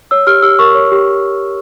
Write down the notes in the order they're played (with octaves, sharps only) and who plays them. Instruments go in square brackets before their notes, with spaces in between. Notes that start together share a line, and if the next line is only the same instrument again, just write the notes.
[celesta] C#5 E6
G4 F6
G4 E6
A#4 C#6
C#5
G4